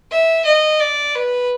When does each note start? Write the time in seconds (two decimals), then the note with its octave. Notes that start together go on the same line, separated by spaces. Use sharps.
0.11 E5
0.45 D#5
0.80 D5
1.15 B4